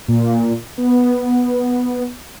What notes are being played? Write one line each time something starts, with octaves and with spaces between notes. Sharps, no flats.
A#2
B3